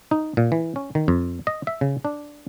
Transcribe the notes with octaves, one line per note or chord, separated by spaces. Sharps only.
D#4
A#2
E3
C#4
D#3
F2
D#5
E5
C#3
D4